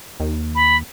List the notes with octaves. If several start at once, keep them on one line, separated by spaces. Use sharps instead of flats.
D#2
B5